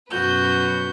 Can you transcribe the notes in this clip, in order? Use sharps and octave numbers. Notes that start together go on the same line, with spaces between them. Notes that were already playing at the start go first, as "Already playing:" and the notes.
F#2 B2 F#4 B4 G6